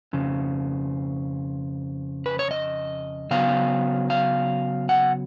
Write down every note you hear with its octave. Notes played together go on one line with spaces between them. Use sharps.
F2 C#3
B4
C#5
D#5
C#3 F#3 B3 F5
F5
F#5